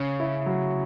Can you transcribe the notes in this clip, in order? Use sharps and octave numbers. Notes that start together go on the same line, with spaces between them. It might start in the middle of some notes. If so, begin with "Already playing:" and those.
Already playing: C#3 C#4
E4
F#3